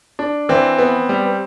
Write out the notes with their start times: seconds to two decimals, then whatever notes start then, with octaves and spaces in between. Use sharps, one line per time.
0.19 D4
0.49 E3 C4
0.79 B3
1.09 G3